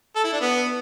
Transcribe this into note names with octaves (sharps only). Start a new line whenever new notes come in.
A4
E4
D4
B3